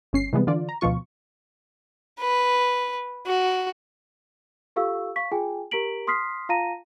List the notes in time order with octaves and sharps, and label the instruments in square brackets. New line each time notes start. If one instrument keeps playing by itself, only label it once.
[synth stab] G1 C#4 C7
C3 E3 G3 G#3 B3
D3 E3 F4 D5
A#5
D2 B2 F3 F4 C#6
[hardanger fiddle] B4
F#4
[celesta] F4 G4 A4 F5 C#6 E6
F5 C#6 B6
F4 G#4 G5 G#5
G4 A#4 A#5 B6 D7 F#7
C6 D#6 F6 B6 C7
F4 F5 A5 A#5 A#6 D#7